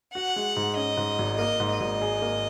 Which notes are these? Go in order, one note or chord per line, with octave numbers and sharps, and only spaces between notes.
F#4 F#5
G#3
G#2
C#4 D#5
G#2
G#1
A#3 D#5
G#2
D#5
G#1
G#4
A#3